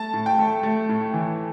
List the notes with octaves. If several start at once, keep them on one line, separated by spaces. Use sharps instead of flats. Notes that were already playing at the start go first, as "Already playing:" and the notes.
Already playing: A3 A5
A2
G5
A3
A3
A2
E3